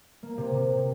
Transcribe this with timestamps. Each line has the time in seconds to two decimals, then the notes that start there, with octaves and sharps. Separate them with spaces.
0.23 A#3
0.38 C3
0.55 C3